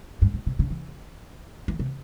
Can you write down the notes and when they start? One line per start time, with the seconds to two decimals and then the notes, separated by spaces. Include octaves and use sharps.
0.22 G2
0.34 A#2
0.47 C3
0.59 C#3
0.70 E3
1.68 E3
1.79 C3